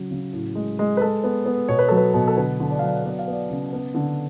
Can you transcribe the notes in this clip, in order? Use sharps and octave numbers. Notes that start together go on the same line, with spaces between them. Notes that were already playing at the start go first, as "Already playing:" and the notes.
Already playing: C#3 F#3
C#3
A2
G#3
G#3
B4
G#3 A4
B3
B3
B2 C#5
B4
F#3 A4
B4
B2
A4
D3 B4
D3
D5
F#3 F5
D5
B3 D5
F5
B3
D5
C#3
B3
D3